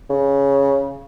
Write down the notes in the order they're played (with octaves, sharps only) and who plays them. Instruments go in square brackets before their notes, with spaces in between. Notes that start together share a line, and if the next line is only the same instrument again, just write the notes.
[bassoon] C#3